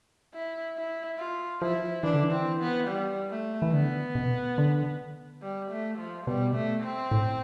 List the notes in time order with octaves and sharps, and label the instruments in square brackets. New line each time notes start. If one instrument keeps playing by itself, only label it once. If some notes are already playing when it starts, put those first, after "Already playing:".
[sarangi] E4
E4
F4
[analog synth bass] F3 [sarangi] E4
[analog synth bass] E3 [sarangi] D4
[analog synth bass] D3
E3
[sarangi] C4
B3
G3
A3
[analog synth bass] E3
[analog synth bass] D3 [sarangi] B3
[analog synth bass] B2
D3
[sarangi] G3
A3
F3
[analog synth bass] B2 [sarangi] G3
[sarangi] A3
C4
[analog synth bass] A2